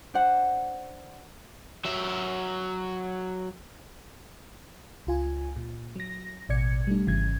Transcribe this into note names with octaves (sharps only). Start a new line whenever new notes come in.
D4 C5 F#5
F#3 E5
C#2 F4 G#5
A#2
F#3 A#6
A1 B2 D5 G#6 C#7
G3 A3 D4
G#1 C#3 E3 G#6